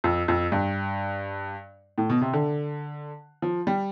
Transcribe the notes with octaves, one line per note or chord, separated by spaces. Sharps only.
F2
F2
G2
A2
B2
C3
D3
F3
G3